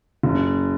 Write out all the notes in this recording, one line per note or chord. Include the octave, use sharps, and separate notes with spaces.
F#1